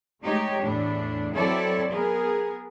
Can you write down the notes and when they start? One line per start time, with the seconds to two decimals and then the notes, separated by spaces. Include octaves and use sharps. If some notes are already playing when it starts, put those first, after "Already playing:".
0.22 G#3 A3 D#4 G4 C#5
0.62 E2 A2 D4
1.36 F#3 C4 E4 A4 C#5 D5
1.92 B3 G#4 A#4